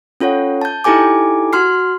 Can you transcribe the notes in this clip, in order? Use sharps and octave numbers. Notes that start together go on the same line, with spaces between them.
C#4 F4 A4 C#5 F#5
A5 G6
D#4 E4 G4 A4 G#5 D6
F#4 C6 F6 C7